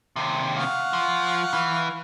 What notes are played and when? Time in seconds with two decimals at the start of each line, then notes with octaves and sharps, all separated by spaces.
0.16 D#2 C3
0.56 F5 F#5 C#6
0.93 F3
1.54 E3